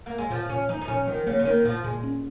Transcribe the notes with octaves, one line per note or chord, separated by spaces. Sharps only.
A#3
G#3
A#2 F3
A#2 C#4
F3 D#4
D#4
A#2 C#4
D#3 F3
C#3 A#3
C#3
D#3 A#3
A#2 F3
A#2 G#3
C#4